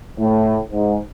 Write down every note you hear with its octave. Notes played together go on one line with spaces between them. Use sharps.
A2
G#2